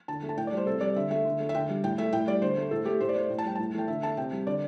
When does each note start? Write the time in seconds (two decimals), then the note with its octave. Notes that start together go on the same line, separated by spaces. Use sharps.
0.08 D3 A5
0.23 A3
0.29 A5
0.37 A2 G5
0.47 D5
0.52 G3 C5
0.66 C3 A4
0.81 G3 D5
0.96 D3 E5
1.11 A3 E5
1.25 D3
1.40 A3
1.49 E5
1.55 D3 G5
1.69 G3
1.84 A2 G5
1.98 A3 E5
2.13 A2 G5
2.27 G3 D5
2.42 D3 C5
2.57 A3
2.71 A2 A4
2.86 A3 G4
3.01 A2 C5
3.09 D5
3.15 A3 C5
3.30 A2
3.39 A5
3.44 G3 G5
3.55 A2 A5
3.74 E3 A3 G5
3.88 D3 E5
4.03 A3 A5
4.17 C3 G5
4.32 G3
4.47 D3 D5